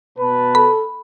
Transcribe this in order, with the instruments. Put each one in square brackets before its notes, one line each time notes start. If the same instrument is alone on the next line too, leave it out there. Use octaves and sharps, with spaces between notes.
[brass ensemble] B2 B4 A5
[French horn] A4 [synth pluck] B5